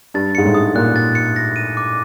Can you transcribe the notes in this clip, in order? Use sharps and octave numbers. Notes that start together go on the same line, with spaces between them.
G2 A6
G#2 C#7
A2
D#6
A#2 F#6
A6
C#7
A#6
D#7
D6